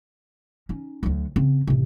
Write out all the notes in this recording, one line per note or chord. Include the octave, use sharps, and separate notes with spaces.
C#4 D#4
D2 F#3
C#3 C4
A1 C3